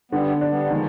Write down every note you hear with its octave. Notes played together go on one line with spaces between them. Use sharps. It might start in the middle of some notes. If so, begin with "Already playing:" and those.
D3 G3 B3
D4
G3 B3
D#3 F3 G#3